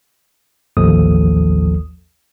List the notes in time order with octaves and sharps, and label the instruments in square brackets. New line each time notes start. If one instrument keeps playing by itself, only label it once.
[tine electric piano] A1 D#2 F3 A4 D#6